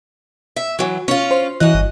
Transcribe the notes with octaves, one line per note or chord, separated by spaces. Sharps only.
E5
E3 F#3
C#4 F4
C5
F#2 E3 D#5 F#6
G1